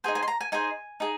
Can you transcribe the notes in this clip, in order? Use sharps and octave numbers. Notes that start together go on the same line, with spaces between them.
D#4 G#4 C5 G#5
G#5
C6
A#5
G#5
D#4 G#4 C5 G#5
D#4 G#4